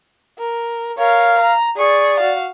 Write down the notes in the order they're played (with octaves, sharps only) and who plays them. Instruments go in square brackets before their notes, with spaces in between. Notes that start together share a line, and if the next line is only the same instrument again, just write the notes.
[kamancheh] A#4
[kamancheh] A#4 C#5 [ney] F5
[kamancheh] A#5
[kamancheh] G#4 C#6 [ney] D5
[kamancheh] F#4 F5